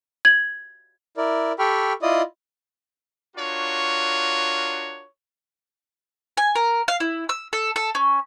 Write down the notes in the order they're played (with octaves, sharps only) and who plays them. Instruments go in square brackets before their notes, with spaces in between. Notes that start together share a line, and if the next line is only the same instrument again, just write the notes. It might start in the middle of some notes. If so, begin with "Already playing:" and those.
[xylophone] G#6 F#7
[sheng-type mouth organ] E4 A#4 D5
G4 A4 G5 B5 C#6 F6
E4 F4 D5 D#5 D#6
[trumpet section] D4 F4 F#4 A#4 C#5
[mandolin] G#5
A#4
F5
E4
E6
A4
A4
C#4